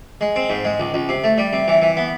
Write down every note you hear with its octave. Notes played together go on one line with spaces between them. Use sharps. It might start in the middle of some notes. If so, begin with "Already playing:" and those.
G#3
C4
G#2
G#3
C#2
C#2
C3
A3
G3
C3
E3
E3
B3